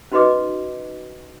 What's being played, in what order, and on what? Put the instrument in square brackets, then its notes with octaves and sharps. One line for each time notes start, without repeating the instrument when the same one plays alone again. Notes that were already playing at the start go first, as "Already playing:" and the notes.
[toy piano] C#4 D#4 F#4 B4 D#5 D6